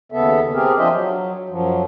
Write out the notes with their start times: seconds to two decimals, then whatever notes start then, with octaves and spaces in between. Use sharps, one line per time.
0.12 D#2 C#3 B3 A4 E5
0.54 C4 G4 G#4 A#4
0.78 F3 D4 F4 C5 D#5 E5
0.91 F#3
1.49 F#2 F3 F#3